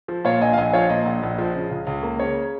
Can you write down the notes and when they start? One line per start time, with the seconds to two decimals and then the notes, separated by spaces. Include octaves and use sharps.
0.08 F3
0.25 A#2 C#5 F5
0.41 A#1 D#5 G#5
0.53 F5
0.58 A#1 D#5 G#5
0.73 F3 C#5 F5
0.89 A#2 D#5
1.06 A#1
1.23 A#1
1.38 F3
1.54 C#3
1.71 C#2
1.87 C#2
2.03 A#3
2.19 C#3 C#5